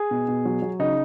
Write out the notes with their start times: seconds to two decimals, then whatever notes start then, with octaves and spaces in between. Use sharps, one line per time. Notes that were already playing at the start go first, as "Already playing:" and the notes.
Already playing: G#4
0.11 B2
0.28 B2
0.45 F#3
0.62 F#3
0.79 C#3 D#4